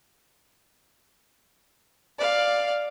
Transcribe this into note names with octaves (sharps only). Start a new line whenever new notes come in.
D5 F5